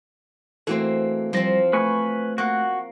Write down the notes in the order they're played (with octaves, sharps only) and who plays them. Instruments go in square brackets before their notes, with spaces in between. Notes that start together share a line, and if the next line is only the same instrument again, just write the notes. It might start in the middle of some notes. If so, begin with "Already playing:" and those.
[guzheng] E3 A#3 C4 [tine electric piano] A3 F#4 A4
[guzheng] F3 C4 [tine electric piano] G3 A#6
[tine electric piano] A3 [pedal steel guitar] B4 G#5 C#6
[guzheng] A#3 [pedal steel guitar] F#4 F#5